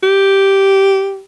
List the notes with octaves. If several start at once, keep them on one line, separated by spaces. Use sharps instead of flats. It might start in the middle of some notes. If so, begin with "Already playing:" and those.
G4